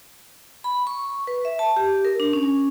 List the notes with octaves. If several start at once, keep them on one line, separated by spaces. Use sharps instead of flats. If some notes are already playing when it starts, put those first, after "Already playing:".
B5
C#6
B4
E5
A5
G4
A#4
D4
C#4